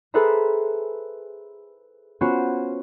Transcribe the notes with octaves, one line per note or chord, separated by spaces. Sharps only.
G#4 A4 B4 C5 E5 A#5
B3 C#4 F4 F#4 C5